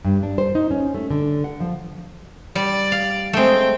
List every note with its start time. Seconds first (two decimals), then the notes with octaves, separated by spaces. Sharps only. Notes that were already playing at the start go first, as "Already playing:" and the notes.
0.04 G2
0.23 D4
0.38 C5
0.55 D#4
0.71 C#4
0.94 A3
1.10 D3
1.44 F#5
1.60 F3
2.55 G3 D5
2.92 F5
3.33 G#3 A3 C4 G5